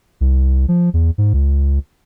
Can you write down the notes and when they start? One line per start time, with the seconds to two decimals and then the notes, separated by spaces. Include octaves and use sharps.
0.21 C2
0.68 F3
0.94 E2
1.18 G#2
1.34 C#2